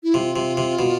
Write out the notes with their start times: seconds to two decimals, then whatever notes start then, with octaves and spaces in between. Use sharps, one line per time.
0.03 E4
0.14 C3 F4
0.36 C3
0.57 C3
0.79 B2